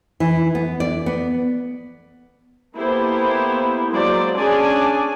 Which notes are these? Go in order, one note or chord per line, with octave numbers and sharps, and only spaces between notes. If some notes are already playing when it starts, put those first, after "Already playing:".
E3
B3
D5
B3
A#3 B3 E4 G4 A4 C5
F#3 G#3 A#3 C5 D5
C#4 D4 G#4 D5 G#5 A5